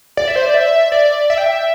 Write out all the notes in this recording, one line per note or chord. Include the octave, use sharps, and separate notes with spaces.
D5
E5
C5
D5
E5
D5
E5
G5
E5